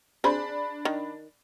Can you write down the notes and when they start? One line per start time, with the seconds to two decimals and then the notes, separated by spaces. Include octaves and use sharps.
0.24 D4 G#4 C5 B5
0.85 D#3